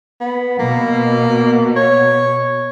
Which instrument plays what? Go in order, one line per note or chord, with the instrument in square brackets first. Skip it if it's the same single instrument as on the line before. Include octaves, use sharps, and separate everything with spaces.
[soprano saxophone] B3
[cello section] B2 [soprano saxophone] A#3
[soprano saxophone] C#5